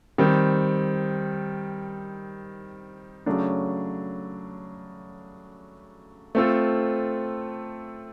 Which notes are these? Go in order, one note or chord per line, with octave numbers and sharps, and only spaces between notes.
D#3 G3 C4
C#3 F#3 A3 D4
A3 C4 F4 A4